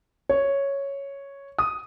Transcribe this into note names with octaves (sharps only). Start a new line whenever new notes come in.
C#5
D#6